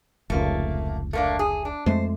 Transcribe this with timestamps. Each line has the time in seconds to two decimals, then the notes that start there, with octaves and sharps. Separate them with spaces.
0.30 F1 C#2 A3 A#3
1.13 A3 A#3 D4
1.39 G#4
1.65 D4
1.86 F2 G#3 A3 C5